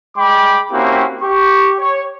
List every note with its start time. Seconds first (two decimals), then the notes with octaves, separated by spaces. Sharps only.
0.17 G#3 G5 B5 D6
0.72 A#3 C4 C#4 E4 F#4 G4
1.22 G4 C#6
1.79 C#5